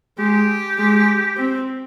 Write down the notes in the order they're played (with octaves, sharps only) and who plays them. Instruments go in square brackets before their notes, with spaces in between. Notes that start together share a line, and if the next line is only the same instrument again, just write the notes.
[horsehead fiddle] G#3 [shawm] G4
[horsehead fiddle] G#3
C4